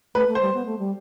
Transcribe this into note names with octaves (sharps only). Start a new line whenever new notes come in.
A3 B4
A3
C5
G3
B3
A3
G3